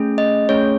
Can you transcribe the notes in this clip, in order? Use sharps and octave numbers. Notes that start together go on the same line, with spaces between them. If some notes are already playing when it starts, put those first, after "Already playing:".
Already playing: A3 C#4 G#4
D#5
A3 C#4 G#4 C#5